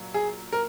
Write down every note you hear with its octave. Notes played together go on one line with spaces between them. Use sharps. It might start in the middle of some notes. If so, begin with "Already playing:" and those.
Already playing: A#2 F#3
G#4
A#4